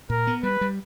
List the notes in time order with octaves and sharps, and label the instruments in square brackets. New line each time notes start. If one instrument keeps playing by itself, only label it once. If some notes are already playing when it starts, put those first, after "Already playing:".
[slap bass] A#2 [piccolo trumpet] A#4
[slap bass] B3
[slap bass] G3 [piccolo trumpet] B4
[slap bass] G3